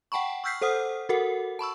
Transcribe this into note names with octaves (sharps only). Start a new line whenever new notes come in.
F#5 G5 A5 B5 C#6
C#6 E6 F6 G6 B6 C7
A4 C5 F#5 D#6 F6
F#4 A4 A#4 F#5
A5 B5 C#6 E6